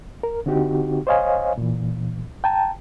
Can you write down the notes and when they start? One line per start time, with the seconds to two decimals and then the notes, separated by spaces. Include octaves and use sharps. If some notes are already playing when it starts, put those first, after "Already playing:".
0.23 A#4
0.46 D3 C4 D#4 F#4 G4
1.07 C5 C#5 D#5 F5 G#5
1.58 A#2 E3
2.44 G5 A5 A#5